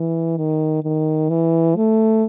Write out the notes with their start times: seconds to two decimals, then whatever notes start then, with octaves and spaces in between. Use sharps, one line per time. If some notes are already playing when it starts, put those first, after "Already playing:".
Already playing: E3
0.37 D#3
0.84 D#3
1.29 E3
1.76 A3